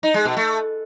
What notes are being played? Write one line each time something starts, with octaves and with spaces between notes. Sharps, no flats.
D#4
G#3
B2
A3